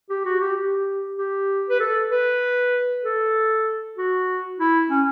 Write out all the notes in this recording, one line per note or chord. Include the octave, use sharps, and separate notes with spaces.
G4
F#4
G4
G4
G4
B4
A4
B4
A4
F#4
E4
C#4